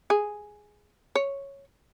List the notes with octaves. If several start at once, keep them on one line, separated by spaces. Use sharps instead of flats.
G#4
C#5